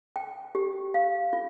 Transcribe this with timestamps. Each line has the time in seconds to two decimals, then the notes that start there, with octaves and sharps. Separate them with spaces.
0.16 G5
0.55 G4
0.94 F5
1.33 F4